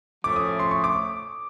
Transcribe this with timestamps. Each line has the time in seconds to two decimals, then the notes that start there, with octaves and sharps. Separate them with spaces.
0.24 A2 F3 A3 C#4 D6
0.36 D#6
0.59 C6
0.71 C#6
0.84 D6